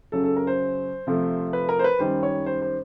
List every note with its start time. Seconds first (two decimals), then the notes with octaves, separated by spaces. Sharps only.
0.12 F#2 C#3 F#3 A4
0.24 A4
0.37 A#4
0.47 C5
1.07 C3 F3 A3
1.53 B4
1.69 A#4
1.79 C5
1.84 B4
1.99 F#2 D#3 G3 C5
2.23 C#5
2.46 C5
2.62 C5